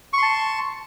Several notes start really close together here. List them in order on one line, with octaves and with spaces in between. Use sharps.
C#6 C6 A5